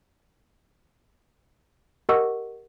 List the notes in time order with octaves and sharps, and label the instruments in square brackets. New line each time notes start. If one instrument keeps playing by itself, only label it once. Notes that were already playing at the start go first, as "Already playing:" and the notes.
[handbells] G4 A#4 D#5 F#5 C#6 E6